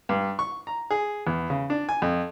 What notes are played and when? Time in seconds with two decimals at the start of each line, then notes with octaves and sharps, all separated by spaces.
0.09 G2
0.39 C#6
0.67 A#5
0.91 G#4
1.27 E2
1.50 C#3
1.70 D4
1.89 G#5
2.02 F2